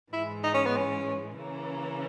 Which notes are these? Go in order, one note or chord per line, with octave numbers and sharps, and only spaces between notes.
G#2 E3 G#3 E4
D#4
C#4
B3
C#4
C#3 E3 A#3 C#4